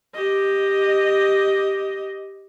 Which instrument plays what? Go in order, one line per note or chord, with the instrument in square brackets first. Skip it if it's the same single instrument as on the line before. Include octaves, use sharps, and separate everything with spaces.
[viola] G4 D#5